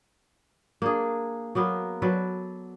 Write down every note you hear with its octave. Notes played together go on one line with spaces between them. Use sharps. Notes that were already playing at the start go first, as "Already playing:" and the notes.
A#3 D4 G#4
F#3 A#3 B3 A#4
F#3 A4 B4 D5